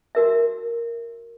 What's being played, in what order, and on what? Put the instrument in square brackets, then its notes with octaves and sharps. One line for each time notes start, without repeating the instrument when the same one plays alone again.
[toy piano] F#4 A#4 E5